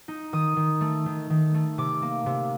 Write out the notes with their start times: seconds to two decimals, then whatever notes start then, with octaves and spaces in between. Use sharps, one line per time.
0.08 D#4
0.33 D#3 D#6
0.57 D#3
0.81 A3
1.06 D#3
1.30 D#3
1.54 A3
1.78 C3 D6
2.02 A#3
2.26 C3